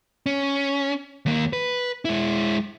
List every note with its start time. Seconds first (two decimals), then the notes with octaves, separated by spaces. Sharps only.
0.26 C#4
1.26 D#2 A#3
1.53 B4
2.05 G#3 E4